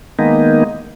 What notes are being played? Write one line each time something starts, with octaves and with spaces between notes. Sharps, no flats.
D#3 G#3 A#3 B3 D#4